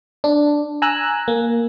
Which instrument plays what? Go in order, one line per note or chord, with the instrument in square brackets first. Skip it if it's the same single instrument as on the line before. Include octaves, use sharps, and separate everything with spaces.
[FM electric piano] D4
G#5 A#5 E6 F#6
A#3